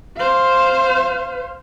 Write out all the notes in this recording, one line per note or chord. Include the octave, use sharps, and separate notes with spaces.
C5 F5